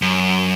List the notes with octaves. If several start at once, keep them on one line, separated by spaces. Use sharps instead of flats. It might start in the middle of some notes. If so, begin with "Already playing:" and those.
F#2